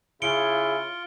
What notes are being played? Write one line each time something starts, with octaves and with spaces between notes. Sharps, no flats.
C#3 E4 F4 C#7 D7 G7